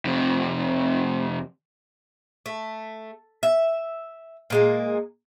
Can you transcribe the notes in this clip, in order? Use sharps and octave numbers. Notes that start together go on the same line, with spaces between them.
F2 C3
A3
E5
A#2 G#3 A#3